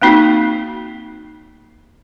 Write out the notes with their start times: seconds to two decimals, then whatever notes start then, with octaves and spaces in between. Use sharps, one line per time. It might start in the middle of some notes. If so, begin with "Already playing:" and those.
0.02 A#3 C4 D#4 F#4